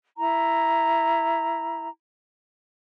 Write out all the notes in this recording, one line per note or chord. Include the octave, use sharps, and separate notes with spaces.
E4 A#5